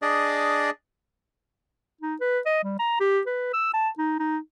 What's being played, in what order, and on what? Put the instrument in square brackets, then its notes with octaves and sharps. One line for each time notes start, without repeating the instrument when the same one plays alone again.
[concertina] D4 G#4 D5 D#5
[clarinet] D#4
B4
D#5
G3
A#5
G4
B4
E6
A5
D#4
D#4